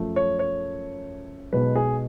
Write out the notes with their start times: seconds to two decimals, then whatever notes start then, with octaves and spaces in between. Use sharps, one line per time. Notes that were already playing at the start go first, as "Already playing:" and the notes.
Already playing: F#2 F3 A3
0.16 C#5
0.39 C#5
1.52 B1 B2 G#3 B4
1.76 G#4